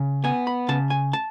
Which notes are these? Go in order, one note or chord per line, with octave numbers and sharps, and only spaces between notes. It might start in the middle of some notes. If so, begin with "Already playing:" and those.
Already playing: C#3
B3 G#5
B5
C#3 A5
G#5
A5